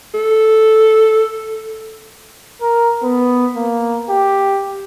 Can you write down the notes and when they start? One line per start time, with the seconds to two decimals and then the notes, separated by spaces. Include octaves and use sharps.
0.14 A4
2.61 A#4
3.03 B3
3.56 A#3
4.09 G4